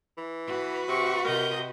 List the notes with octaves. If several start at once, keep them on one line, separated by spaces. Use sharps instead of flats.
E3
F#4 B4
C3 C#6
C3 A#4 D#5 G6